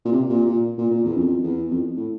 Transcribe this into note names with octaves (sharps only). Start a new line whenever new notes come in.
A#2
C3
A#2
A#2
A#2
A#2
E2
F2
E2
F2
A2